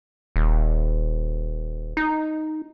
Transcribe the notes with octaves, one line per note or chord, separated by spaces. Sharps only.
D#1
D#4